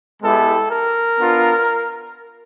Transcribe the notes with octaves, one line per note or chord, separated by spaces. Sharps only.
G#3 B3 E4 G4 A4
A#4
B3 D4 F4